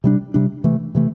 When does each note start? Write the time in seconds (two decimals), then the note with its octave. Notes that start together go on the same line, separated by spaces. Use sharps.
0.04 C3 G3 D4
0.34 C3 G3 D4
0.64 C3 E3 A3
0.95 C3 E3 A3